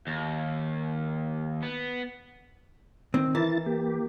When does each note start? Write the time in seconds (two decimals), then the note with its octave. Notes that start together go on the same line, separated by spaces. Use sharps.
0.07 D#2
1.63 B3
3.14 D#3 C4
3.35 E3 E4 A#4 A6
3.66 A#3 G4